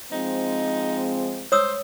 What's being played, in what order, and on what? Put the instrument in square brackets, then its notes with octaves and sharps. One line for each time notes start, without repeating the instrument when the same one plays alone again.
[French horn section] F3 G#3 C4 [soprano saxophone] D#4
[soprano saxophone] C5 [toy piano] C#5 D#6 E6